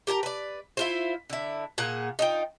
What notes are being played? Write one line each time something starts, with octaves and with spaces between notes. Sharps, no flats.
G4 A#4 G#5 A#5
B4 D5
E4 F4 C5
D3 E4
A#2 G#4 F#5
D#4 F4 G5